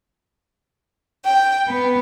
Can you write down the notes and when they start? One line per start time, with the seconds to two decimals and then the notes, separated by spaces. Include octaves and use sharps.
1.25 G5
1.69 B3